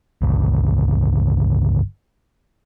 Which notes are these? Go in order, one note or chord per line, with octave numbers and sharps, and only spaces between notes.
G1 C#2